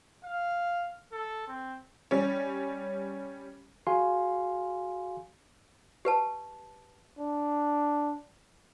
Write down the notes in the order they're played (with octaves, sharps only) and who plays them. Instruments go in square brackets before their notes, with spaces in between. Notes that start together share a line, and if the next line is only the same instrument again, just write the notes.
[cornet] F5
A4
C4
[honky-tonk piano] G3 C#4
[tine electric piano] F#4 G#4 F5 G#5 C6
[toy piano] G4 B4 A5
[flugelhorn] D4